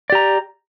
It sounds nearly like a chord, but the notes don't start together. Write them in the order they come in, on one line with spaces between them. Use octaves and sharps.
D5 G4 A#5